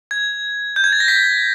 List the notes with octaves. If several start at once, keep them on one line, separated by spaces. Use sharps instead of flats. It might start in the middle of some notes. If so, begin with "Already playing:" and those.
G#6
G6
G#6
A6
A#6
B6